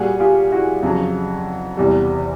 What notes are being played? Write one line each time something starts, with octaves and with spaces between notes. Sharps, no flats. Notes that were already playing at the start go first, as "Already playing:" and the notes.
Already playing: A#2 G3 F#4 G#4
F4 G4
E4 F#4
F2 C#3 F#3
E2 C3 E3 G3